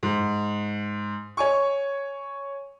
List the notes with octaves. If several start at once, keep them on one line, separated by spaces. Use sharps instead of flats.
G#2
C#5 G#5 C#6